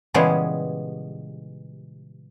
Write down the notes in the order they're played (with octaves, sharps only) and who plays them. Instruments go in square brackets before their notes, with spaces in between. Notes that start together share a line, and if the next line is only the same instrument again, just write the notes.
[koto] A#2 C#3 E3 G3 G#3 B3